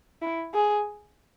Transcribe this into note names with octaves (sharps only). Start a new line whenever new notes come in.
E4
G#4